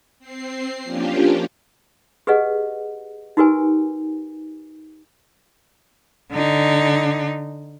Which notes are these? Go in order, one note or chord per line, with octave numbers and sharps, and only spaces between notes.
C4 C7
F3 A#3 C#4 D4 F4 G4
G4 G#4 B4 D#5 F#5
D#4 F#4 G4 A#4 B4 G#5
D3 D#4